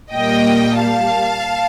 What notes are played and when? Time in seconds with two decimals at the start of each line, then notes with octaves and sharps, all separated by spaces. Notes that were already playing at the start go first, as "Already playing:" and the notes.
0.13 A#2 G3 A#3 D#5 G5
0.79 F5 A5